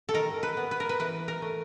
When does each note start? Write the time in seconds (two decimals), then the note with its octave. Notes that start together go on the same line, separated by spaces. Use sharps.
0.09 A4
0.14 D#3 A#4
0.43 B4
0.57 B3
0.71 B4
0.80 A#4
0.89 B4
1.00 E3 B4
1.28 A#4
1.42 A3